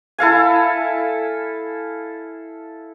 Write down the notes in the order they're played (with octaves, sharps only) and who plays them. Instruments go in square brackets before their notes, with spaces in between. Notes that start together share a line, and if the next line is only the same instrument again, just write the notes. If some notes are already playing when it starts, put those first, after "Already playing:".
[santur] E4 A4 F5 G#5